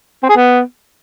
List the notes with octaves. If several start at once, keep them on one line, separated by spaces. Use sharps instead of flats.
C4
G#4
B3